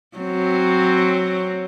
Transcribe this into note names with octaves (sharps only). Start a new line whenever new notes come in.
F#3 C4